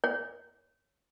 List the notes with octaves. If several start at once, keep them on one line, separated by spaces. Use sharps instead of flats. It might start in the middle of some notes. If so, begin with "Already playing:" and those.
C#5